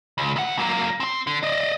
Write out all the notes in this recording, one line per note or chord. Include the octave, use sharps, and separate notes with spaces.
C#2
D2 F#5
F#3 A#3
C4 C6
D3
D5 D#5